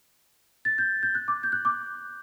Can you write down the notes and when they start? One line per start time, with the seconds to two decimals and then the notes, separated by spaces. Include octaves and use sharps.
0.65 A6
0.78 G6
1.03 G6
1.15 F#6
1.28 D6
1.43 G6
1.52 F#6
1.65 D6